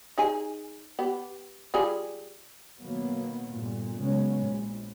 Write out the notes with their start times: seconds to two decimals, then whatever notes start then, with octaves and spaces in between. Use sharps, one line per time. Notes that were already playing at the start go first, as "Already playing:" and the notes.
0.18 D#4 G#4 G#5
0.99 B3 G4
1.74 G3 F4 G#4
2.79 B2 D#3 F#3 A#3 B3
3.52 G1 A#2
3.99 C#3 F#3 G#3 B3 C#4
4.38 A#1